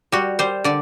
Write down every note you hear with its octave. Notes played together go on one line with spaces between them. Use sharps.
G3 F#4
G3 C5
D3 D5